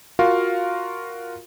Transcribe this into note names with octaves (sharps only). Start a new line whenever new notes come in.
F4 F#4 A#4 F5